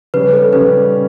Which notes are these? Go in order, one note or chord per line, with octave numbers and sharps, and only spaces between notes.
C#3 G3 C#4 B4
A4
C#3 G3 C#4 B4